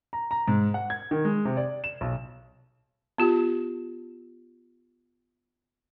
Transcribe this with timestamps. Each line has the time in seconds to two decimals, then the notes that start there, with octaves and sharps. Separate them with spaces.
0.13 A#5
0.31 A#5
0.48 G#2
0.74 F#5
0.90 G#6
1.11 D#3
1.25 G#3
1.45 C3
1.57 D5
1.84 E7
2.01 B1
3.18 B3 F4 G4